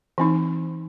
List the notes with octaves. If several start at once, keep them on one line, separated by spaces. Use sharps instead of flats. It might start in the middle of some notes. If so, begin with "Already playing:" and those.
E3 C4 D#4